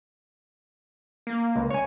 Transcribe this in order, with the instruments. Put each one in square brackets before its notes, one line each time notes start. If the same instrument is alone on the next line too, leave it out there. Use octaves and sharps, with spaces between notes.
[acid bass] A#3
[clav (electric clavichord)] C#2
C#5 G#5